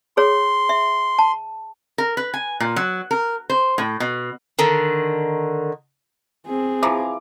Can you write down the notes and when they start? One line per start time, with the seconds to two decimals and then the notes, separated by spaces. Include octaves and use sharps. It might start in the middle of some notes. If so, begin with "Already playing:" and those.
0.17 G#4 C#5 C6
0.69 E5
1.19 A5
1.98 A#4
2.17 B4
2.34 G#5
2.60 A#2
2.76 F#3
3.11 A#4
3.50 C5
3.78 A2
4.00 B2
4.59 D3 D#3
6.46 C4 G#4
6.83 E3 F3 G#5 A#5 D6